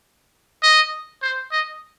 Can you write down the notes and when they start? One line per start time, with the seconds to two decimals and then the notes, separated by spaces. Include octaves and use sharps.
0.63 D#5
1.22 C5
1.52 D#5